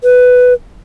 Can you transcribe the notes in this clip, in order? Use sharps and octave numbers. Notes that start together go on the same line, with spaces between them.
B4